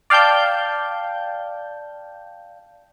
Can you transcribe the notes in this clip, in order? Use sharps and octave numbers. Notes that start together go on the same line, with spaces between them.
D5 F5 G5 A5 G6